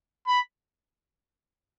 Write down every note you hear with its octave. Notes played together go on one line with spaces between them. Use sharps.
B5